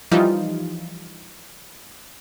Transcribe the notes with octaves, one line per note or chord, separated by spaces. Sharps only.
E3 F3 G3 D#4 F4